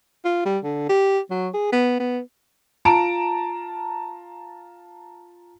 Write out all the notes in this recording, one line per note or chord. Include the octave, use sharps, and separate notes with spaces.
F4
G3
D3
G4
F#3
G#4
B3
B3
F4 A5 A#5 D7